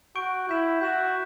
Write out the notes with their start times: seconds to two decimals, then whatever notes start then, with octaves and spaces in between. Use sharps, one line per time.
0.15 F#4 C#6 G6 D7
0.49 E4 G6 B6 E7
0.81 F#4 G6 B6 E7